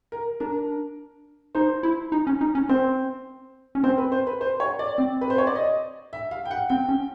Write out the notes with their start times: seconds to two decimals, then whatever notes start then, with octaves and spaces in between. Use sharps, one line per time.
0.12 A#4
0.40 D4 A#4
1.55 D#4 C5
1.83 E4
2.12 D#4
2.27 C#4
2.41 D#4
2.55 C#4
2.69 C4 C5
3.75 C#4
3.83 C4 C5
3.98 B4
4.12 C5
4.27 B4
4.41 C5
4.60 C#5
4.79 D5
4.98 C4
5.21 B4
5.30 C5
5.38 C#5
5.47 D5
5.55 D#5
6.13 E5
6.31 F5
6.45 G5
6.51 F#5
6.69 C4 G5
6.88 C#4